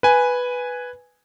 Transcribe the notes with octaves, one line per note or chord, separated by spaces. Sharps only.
B4 G#5